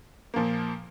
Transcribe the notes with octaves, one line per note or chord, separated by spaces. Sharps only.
A#2 F3 A#3